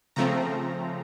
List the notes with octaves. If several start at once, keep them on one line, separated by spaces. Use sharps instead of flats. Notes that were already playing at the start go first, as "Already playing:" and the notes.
C#3 F3 A3 C4 A#5